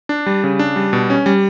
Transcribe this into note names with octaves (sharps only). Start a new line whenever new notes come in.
D4
G3
C#3
D4
G3
B2
C#4
G3